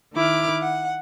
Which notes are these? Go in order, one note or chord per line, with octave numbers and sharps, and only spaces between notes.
D#3 E4 D6 F6
F#5